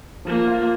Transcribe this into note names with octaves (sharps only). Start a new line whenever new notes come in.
F3 A#3
F4